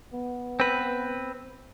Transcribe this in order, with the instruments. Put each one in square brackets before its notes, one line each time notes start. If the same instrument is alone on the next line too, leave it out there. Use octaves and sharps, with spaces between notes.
[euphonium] B3
[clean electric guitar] C4 B4